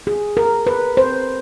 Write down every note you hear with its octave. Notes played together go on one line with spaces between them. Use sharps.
G#4
A#4
B4
C5